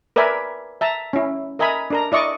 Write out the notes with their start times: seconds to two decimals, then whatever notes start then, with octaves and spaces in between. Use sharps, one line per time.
0.16 A#4 B4 D5 E5 G#5 B5
0.81 E5 A5 A#5
1.13 C#4 E4
1.59 A#4 D#5 E5 G#5 A#5 B5
1.90 D4 A#4 A#5
2.12 E4 D5 D#5 C#6 D6